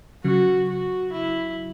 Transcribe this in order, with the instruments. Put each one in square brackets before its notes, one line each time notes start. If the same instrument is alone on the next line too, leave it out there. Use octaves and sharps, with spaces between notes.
[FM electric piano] C#3 F#3 [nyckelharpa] F#4
[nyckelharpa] F#4
E4